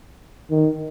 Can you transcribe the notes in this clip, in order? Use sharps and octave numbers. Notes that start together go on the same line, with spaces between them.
D#3